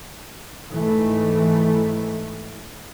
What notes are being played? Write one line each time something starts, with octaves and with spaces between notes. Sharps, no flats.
G#2 E3 A3